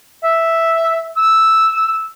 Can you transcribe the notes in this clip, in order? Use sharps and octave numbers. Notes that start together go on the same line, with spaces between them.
E5
E6